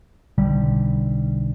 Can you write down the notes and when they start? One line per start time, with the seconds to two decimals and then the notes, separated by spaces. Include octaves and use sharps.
0.38 B1 D3 G3